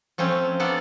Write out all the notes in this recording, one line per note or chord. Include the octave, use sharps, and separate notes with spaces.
F3 A3 C4 C#4
A#3 B3 D4 A4 D5